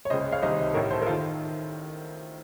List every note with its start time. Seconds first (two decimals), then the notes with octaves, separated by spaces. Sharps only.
0.05 C#5
0.10 C#2 C#3 C5 D#5
0.32 C#5 F5
0.42 C2 C3 D#3 C5 D#5
0.74 A1 A2 A#4 C#5
0.90 A4 C5
1.02 A#4
1.06 F4 A4
1.09 D#3